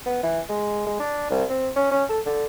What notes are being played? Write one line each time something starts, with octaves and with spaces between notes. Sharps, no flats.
B3
E3
G#3
G#3
D4
C2
C4
C#4
C#4
A4
D3